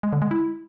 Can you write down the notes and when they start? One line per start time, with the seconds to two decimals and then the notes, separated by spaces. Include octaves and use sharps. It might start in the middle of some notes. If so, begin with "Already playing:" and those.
0.03 G#3
0.13 D3
0.22 G#3
0.31 E4